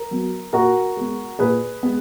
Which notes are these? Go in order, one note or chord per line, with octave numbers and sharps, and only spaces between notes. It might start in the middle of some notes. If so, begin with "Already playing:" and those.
Already playing: A#4
F#3 B3
A#2 F#4 A#4
G#3 B3
A#2 G#4 B4
G#3 B3